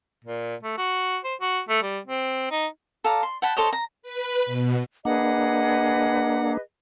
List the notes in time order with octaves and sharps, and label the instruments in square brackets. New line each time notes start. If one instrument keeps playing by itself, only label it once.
[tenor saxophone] A#2
A3
F#4
C5
F#4
A3
G3
C4
D#4
[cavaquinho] A4 D5 F5 A#5
C6
F#5 G5 A5 B5
A4 C5 C#5 D#5
A#5
[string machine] B4
B2
[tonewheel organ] A#3 D4 [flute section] G#4 B4 D#5 [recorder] F#5